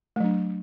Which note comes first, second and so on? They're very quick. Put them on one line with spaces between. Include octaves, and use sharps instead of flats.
A3 F#3 D4